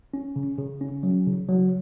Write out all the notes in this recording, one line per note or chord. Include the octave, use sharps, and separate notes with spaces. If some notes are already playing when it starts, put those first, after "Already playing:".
C#4
C#3
C#3
C#4
F#3
C#3
F#3